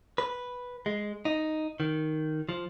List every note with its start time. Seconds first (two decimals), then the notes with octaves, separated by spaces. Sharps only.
0.18 B4
0.86 G#3
1.25 D#4
1.80 D#3
2.49 F3